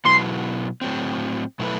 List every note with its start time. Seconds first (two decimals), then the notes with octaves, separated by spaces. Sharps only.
0.05 B2 F#3 B3 E4 C6
0.81 A2 F#3 C4
1.59 B2 F#3 A3 E4 B4